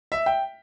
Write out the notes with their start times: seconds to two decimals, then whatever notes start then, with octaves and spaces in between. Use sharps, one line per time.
0.12 E5
0.26 G5